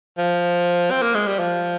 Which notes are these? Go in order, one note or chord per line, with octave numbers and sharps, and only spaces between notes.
F3
C4
A#3
G#3
G3
F3